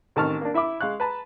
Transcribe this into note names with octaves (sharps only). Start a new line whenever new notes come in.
A1 D#3 C4 A5 C#6 F6
A#3 D4
E4 E5 B5 D6
G#3 F5 C#6 F#6
B4 A5 A#5